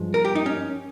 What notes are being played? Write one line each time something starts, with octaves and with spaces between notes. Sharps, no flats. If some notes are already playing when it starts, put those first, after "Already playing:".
Already playing: G2 F3 G#3
A#4
G4
D#4
C#4